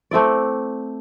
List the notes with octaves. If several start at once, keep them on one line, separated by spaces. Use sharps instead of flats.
A3 C4 E4 D5